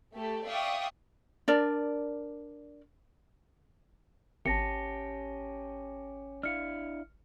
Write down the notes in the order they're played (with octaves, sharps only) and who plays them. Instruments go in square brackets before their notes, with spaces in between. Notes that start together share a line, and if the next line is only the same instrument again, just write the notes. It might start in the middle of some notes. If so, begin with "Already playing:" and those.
[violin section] A3 G4 A4
D5 E5 F5 G5 C#6 D#6
[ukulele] D4 A#4 D5
[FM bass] G#1 [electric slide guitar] C#4 G4 [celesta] A5 A#6 C#7
[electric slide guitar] D4 E4 F5 [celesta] F6 C#7